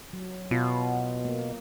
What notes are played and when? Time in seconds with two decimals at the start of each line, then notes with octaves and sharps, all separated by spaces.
0.13 F#3
0.51 B2 B3 F4
1.25 A#3